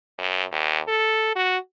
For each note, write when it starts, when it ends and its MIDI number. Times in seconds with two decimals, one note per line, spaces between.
0.18 0.43 42
0.51 0.79 39
0.88 1.35 69
1.35 1.57 66